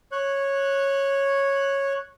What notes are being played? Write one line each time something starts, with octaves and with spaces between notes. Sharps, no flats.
C#5 F#6